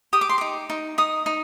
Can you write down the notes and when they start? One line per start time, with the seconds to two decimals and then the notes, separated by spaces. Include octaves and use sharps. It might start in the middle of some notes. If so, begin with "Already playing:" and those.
0.13 G4 D#6
0.21 D6
0.29 C6
0.38 D#4 D6
0.70 D#4
0.98 D#4 D#6
1.26 D#4